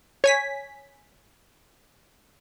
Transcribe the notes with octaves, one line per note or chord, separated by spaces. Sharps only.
C#5 G#5 B6